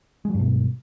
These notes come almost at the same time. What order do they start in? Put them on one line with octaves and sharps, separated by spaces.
G#3 F#3 G2 B2